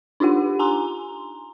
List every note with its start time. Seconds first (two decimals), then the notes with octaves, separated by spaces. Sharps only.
0.20 D4 D#4 F4 G4 F#5
0.59 G#5 A#5 C6